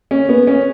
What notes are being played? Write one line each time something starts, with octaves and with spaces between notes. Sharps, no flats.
C#4
B3
C#4